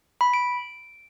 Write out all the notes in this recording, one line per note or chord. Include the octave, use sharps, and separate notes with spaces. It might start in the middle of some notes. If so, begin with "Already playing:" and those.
B5
D7